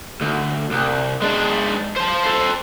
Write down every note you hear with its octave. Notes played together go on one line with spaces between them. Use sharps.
D2
C2
G#3 D4
C5 A5
A4 C5